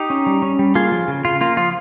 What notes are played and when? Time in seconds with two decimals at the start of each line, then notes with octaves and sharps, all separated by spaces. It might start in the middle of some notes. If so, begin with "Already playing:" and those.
Already playing: D#4 G4
0.10 C#4
0.26 G3
0.42 C#4
0.59 G3
0.75 A#3 F4 G#4
0.92 F3
1.08 C#3
1.25 C#3 F4
1.41 A#3 F4
1.57 F3 F4